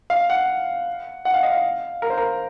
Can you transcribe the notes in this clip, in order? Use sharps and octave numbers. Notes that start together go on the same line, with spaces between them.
F5
F#5
F#5
F5
D#5
F5
A#4
C5
A#4